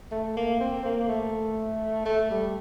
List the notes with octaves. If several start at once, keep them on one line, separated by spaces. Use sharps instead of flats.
A3
A#3
C4
A#3
A3
A3
G3